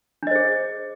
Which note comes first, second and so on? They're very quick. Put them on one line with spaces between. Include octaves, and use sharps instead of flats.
D4 D#5 C5 G#4